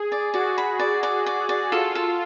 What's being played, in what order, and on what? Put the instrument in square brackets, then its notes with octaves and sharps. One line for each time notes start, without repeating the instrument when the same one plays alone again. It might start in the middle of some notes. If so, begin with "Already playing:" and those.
Already playing: [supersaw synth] G#4
[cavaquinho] D5
[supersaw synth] F#4 [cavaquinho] D5
[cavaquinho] B5
D5
D5
D5
D5
[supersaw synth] F4 [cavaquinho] A4
[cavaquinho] A4